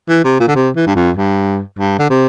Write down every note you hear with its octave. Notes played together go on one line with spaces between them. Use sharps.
E3
C3
A#2
D3
C3
E3
G2
F2
G2
G2
D3
C3